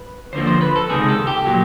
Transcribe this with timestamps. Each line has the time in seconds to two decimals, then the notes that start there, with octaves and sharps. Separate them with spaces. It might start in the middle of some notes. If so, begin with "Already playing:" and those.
Already playing: B4
0.33 D2 D3 F3 A#3 C5
0.47 C5
0.61 B4
0.76 A4
0.90 C#2 C3 D#3 G#3 G#4
1.09 A4
1.27 G4
1.46 A#2 F#3 A#3